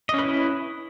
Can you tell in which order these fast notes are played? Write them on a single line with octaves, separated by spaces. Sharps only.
D#5 C#4 B4 E4